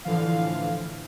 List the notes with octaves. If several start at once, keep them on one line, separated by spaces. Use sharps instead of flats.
A2 D3 E3 F3 F5